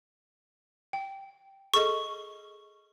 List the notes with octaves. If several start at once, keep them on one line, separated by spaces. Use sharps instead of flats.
G5
G#4 A4 D#5 C#6